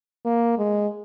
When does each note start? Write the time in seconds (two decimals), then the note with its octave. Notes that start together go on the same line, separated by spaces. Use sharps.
0.25 A#3
0.58 G#3